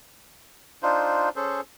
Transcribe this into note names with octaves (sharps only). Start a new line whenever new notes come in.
D4 D#4 F4 C5
C#4 G#4 A4 C5